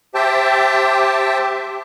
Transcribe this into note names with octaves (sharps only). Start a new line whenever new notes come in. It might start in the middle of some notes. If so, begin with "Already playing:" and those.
G4 C5 E5 G5 A5